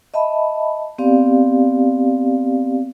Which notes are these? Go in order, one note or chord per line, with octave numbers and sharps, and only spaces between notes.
D#5 E5 A5 B5
B3 C4 G4 D5 F5